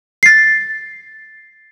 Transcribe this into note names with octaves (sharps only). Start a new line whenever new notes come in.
A6 C7